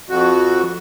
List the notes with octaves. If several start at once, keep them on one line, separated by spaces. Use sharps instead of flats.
F2 F#4